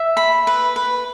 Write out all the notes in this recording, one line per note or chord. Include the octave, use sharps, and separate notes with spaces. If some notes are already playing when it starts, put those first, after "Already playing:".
Already playing: E5
B5
B4
B4